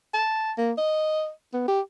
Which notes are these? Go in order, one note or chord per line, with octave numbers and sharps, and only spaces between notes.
A5
A#3
D#5
B3
G4